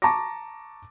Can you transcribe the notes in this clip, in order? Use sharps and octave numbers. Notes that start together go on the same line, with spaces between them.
A5 A#5 C#6 D6 A#6